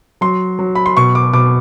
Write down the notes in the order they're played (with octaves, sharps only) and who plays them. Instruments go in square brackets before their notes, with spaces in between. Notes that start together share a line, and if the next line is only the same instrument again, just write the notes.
[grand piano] F#3 C6
F#3
B5
C6
B2 C#6
D6
B2 D6